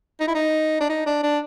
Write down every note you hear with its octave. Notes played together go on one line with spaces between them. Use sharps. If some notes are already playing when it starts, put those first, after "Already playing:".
D#4
E4
D#4
D4
D#4
D4
D4